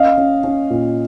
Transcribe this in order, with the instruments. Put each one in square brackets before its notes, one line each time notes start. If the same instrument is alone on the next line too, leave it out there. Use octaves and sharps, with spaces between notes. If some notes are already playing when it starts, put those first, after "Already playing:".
Already playing: [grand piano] C#4 D#5 F5
C#4
C#4
A#2